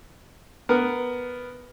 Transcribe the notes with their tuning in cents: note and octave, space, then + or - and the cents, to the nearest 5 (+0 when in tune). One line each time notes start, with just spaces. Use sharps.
B3 +0 A#4 +0